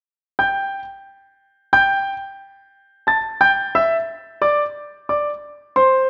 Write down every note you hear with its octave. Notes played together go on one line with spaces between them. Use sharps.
G5 G6
G5 G6
A5 A6
G5 G6
E5 E6
D5 D6
D5 D6
C5 C6